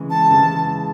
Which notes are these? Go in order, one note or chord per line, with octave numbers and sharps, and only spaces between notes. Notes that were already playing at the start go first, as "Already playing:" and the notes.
Already playing: C#3 E3 G#3
A5
C#3 E3 G#3